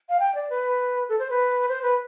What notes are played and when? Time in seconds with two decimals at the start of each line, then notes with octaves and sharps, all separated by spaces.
0.09 F5
0.20 G5
0.35 D5
0.50 B4
1.09 A4
1.19 C5
1.30 B4
1.69 C5
1.83 B4